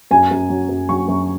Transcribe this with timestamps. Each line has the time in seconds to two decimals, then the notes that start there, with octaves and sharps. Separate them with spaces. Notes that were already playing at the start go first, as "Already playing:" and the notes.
0.11 F#2 G#5
0.31 F#2
0.49 F#3
0.69 F#2
0.89 F#3 C#6
1.08 F#2